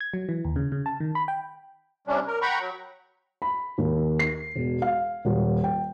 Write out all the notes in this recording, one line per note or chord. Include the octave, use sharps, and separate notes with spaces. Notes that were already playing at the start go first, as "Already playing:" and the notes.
G#6
F#3
E3
D#2
C#3
C#3
A5
D#3
B5
G5
C3 G3 C#4 D4
A#4
F#5 G5 A#5 B5 C#6
F#3
B5
D#2
C7
E1
F5
D#1
G5